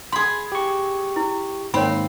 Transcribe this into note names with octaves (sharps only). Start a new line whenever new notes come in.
G#4 B5 C6
G4 C#6
E4
G#2 D#3 A#3 C4 C#5 B5